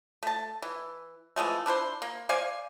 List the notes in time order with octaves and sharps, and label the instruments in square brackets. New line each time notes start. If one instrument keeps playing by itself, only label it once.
[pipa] A3 A5
E3
E3 F3 G#3 A3
D4 E4 B4 C5
A#3
C5 D5 F5 G#5